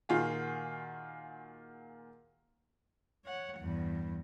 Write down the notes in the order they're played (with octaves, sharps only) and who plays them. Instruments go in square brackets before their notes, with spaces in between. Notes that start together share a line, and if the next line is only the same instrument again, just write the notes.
[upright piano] A#2 D#3 F4 F#4 G#4
[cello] C#5 F#5
E2 G2